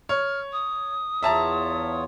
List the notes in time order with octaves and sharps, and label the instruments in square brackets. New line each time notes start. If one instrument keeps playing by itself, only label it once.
[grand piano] C#5 [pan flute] F6
[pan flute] D#6
[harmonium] E2 F4 C#5 [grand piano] E5 A5 A#5